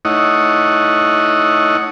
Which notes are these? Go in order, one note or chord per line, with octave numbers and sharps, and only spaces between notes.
A3 D#4 E4 C#5 D#5 F#5